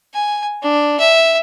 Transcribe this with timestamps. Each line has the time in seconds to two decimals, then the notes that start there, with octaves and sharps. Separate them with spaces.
0.14 G#5
0.62 D4
1.00 E5